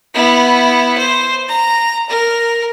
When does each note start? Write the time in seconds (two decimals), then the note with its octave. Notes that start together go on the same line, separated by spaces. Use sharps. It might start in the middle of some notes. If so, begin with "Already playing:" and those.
0.14 B3 E4
0.98 C5
1.49 A#5
2.09 A#4